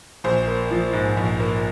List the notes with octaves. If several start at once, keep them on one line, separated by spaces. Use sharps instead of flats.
A#1 C5
A#3
F3
G#2
A#1
A#3